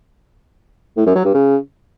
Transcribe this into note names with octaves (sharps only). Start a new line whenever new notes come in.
A2
F#2
F#3
G2
C#3